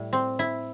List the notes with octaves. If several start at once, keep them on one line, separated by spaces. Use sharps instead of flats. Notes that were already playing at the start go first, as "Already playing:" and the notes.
Already playing: A2 G3
C4
E4